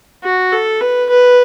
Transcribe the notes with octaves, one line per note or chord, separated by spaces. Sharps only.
F#4
A4
B4
B4